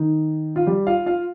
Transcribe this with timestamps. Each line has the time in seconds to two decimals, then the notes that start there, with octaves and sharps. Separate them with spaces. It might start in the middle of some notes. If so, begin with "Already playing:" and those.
Already playing: D#3 D#4
0.56 F4
0.67 G3 G4
0.87 F4 F5
1.06 F4 F5